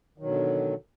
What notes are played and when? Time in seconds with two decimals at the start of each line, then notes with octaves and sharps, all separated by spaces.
0.18 D#3
0.20 F#3
0.23 B2
0.25 D3